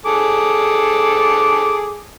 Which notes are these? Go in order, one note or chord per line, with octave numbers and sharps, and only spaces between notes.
G#4 A4 D6